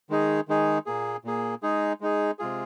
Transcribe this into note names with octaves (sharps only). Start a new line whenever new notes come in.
D#3 G#3 D#4 G#4
D#3 G#3 D#4 G#4
A#2 A#3 G#4
A#2 A#3 G#4
G#3 D#4 G#4
G#3 D#4 G#4
C3 G#3 F4 G#4